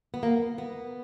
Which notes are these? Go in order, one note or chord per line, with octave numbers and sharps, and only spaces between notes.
B3
A#3
B3